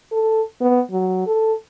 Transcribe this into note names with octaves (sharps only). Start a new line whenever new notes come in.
A4
B3
F#3
A4